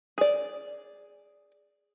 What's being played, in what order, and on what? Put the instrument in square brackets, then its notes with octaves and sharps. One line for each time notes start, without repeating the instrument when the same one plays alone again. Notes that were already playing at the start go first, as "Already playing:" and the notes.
[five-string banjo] G#4 D5